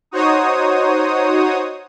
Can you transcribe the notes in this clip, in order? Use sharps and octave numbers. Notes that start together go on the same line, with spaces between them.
D#4 F#4 C5 C#5 D#6